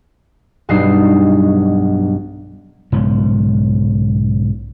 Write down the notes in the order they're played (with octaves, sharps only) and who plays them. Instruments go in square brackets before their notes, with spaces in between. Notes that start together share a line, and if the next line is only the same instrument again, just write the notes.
[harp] B1 G2 F#3 D4 D#4 C7
[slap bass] B1 G#2 C#3 F3